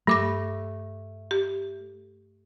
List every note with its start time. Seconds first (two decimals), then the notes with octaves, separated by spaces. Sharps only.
0.07 G2 A3 D6 A#6
1.31 G4